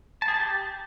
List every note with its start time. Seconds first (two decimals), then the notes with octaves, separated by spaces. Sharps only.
0.22 A5
0.28 G#4
0.34 A5
0.40 G4